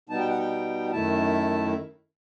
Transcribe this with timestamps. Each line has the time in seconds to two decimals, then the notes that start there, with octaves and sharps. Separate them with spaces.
0.09 B2 G3 B3 D#4 A5
0.19 G5
0.29 F#5
0.38 G5
0.92 F#2 D#3 A3 E4 A5